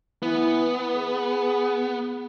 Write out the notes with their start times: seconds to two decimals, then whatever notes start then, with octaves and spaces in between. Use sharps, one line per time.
0.23 E3 B3
0.96 G#4